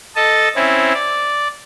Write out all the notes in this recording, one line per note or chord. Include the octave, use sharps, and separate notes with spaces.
A4 D#5 A5
C4 C#4 E4
D5